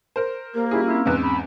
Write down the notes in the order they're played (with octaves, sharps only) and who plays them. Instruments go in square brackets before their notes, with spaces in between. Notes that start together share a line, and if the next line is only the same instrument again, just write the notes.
[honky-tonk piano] A#4 C5
[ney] A#3 [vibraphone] G4 C5 [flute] A#4
[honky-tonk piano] G3 G#4 [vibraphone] C#4 F4 [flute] E4
[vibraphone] C4 C#4 E6 [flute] E4
[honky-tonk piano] E2 G#2 [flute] B4
[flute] B5